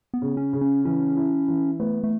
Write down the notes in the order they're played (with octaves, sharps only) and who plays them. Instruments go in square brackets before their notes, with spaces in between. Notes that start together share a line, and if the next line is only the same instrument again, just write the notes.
[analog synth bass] B3
[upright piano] C#3
[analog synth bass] C#4
[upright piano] C#3
[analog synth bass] C#4
[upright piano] E3 [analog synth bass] C#4
[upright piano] E4
E3
[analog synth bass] A3 [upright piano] B3
[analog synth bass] A3